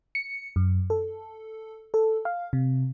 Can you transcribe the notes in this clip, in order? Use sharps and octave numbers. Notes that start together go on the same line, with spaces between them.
C#7
F#2
A4
A4
F5
C3